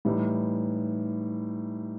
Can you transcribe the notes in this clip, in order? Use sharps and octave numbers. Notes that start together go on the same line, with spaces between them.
A2 E3 G3 D#4